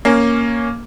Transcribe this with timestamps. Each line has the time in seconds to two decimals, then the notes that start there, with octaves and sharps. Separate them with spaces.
0.05 A#3 C#4